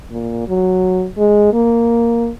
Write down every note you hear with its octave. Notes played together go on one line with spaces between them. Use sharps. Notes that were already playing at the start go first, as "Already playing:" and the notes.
A#2
F#3
G#3
A#3